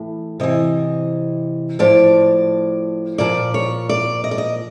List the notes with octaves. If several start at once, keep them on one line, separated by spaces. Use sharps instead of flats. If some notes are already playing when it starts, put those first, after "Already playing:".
Already playing: A2 E3
C3 E3 D#5
A2 F3 D5
A#2 F3 D5
C#5
D5
D#5
D5
D#5